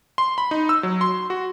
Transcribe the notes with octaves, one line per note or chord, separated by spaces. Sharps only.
C6
B5
D#4
E6
F#3
C6
F#4